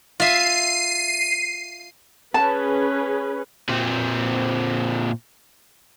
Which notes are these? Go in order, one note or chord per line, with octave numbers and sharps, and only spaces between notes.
F4 E5 C7 D#7
C#4 G#4 B4 A5
A#2 C4